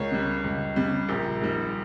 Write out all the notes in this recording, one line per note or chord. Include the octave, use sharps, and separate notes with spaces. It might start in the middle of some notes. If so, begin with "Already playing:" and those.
Already playing: C#2 A#4 C#5
C#3 G3
C#2
C#3 G3
A#1 G4 A#4
G#2 D#3 G3